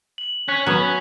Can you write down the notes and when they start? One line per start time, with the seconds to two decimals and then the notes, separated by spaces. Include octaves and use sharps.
0.18 F#7
0.48 C#4 C#6 F#6 B6
0.67 F#3 B3 C#4